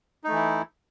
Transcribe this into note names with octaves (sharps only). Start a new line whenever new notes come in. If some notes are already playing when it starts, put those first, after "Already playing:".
E3 A3 D#4 E4